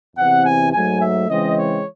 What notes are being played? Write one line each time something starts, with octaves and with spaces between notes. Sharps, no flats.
E2 C3 E3 C4 F#5
G#5
G#2 F#3 A3 G#5
E5
C#3 E3 G#3 C4 D#5
C#5